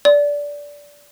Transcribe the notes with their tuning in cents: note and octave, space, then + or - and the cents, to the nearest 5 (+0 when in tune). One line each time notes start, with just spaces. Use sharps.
D5 -15